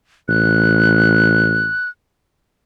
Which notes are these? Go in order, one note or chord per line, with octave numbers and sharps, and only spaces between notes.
A1 F#6